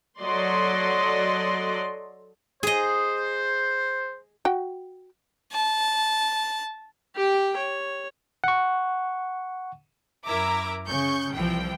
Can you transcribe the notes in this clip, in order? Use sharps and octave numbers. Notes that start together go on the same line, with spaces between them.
F#3 A4 D5 D#5 C6
G#4 C5 D#5
F#4 G5
A5
G4 G5
C#5
F#5 C#6
F#2 E4 A#4 E5 A#5 D6
C#3 C#6 G6
C2 E3 F3 G5